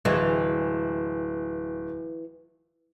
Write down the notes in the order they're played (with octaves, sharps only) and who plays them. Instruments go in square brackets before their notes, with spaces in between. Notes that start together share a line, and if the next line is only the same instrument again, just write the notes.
[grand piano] D1 [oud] E3 G#3